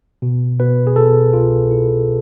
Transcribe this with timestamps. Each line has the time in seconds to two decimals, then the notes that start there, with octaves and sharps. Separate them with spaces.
0.22 B2
0.59 B2 B4
0.87 G#4
0.96 B2 A4
1.33 C2 F4
1.70 B2 E4